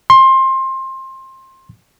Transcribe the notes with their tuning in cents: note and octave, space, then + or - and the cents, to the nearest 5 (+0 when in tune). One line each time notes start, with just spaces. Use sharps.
C6 +20